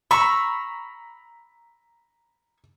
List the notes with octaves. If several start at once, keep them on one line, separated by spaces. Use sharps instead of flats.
A#5 B5 C#6 E6